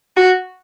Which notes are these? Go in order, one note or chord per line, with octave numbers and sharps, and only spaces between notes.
F#4